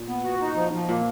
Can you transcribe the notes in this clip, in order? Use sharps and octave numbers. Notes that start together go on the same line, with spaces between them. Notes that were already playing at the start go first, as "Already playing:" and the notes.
Already playing: A#2
B3
F#4
D#4
F3
F3
A#2 A#3